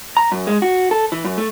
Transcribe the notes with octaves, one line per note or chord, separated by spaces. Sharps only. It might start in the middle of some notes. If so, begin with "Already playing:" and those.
A#5
F#2
G#3
F#4
A4
E3
F#2
A3